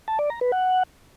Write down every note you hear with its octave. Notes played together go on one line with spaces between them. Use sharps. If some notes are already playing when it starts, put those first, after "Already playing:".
A5
D5
A#5
B4
F#5